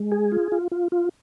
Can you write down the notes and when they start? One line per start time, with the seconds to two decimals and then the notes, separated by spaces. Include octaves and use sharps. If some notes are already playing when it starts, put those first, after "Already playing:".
Already playing: G#3
0.12 G#4
0.32 F4
0.52 F4
0.72 F4
0.92 F4